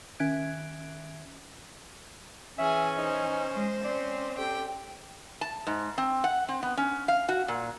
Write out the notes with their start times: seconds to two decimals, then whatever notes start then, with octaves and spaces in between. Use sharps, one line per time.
0.20 D#3 C#4 E5 F#6 G#6 D7
2.59 E3 C#4 G#4 E5 G#5
2.98 D#4 C5
3.55 G#3
3.85 C4 C#4 D5
4.38 G4 A4 G5
5.41 A5
5.67 G#2
5.98 C4
6.24 F#5
6.49 C4
6.63 B3
6.77 C#4
7.08 F5
7.29 F#4
7.48 A#2